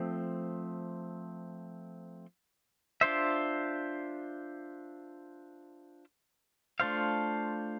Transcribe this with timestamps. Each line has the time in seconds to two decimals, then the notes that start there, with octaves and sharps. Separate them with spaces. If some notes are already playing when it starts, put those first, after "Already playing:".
Already playing: F3 A3 C4
3.01 D4 F4 C5 E5
6.80 A3 D4 F4 C5 F5